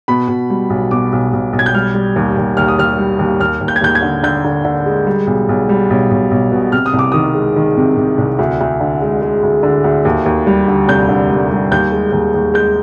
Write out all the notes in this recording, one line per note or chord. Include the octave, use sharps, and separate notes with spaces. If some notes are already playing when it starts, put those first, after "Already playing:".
B2 B5
B2
G3
B1
B2 D6
B1
B1
B1
G#6
G6
G3 F6
G3
D#2
D#2
D#2 F6
D#6
D#2 F6
G3
D#2
D#2 F6
D#2
G6
G#6
D#2 G6
G#6
D3
D3 G6
D3
D3
G#3
G3
B1
B1
G3
B1
B1
B1
B2
C3 F6
D#6
C2
D6
D#3 D#6
G#3
D#3
C3
C3
C2
D2
D2
D3
G#3
G#3
D2
D3
D2
D#2
D#2
G3
D3
F1 G6
D3
G3
G3
D#2 G6
G#3
D#2
D#2
G#3 G6